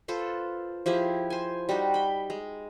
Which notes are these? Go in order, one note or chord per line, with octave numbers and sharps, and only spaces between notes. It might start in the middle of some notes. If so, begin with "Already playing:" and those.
F4 A4 B4 C5
F3 E4 G4 G#4
C5 G#5
G3 D#4 F#4 G4
G5 B5
G#3